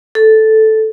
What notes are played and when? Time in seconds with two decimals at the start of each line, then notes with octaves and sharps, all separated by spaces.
0.15 A4